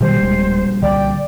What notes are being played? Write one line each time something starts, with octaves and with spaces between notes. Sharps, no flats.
A#1 B2 D#3 G3 C5
D1 G#3
C2 D3 D5 G5